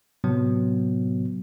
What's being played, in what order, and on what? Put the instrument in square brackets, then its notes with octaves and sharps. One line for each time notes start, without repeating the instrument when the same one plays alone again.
[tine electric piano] A2 C3 F#3 B3